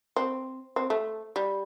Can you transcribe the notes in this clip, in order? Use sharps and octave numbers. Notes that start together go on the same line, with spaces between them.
C4
C4
A3
G3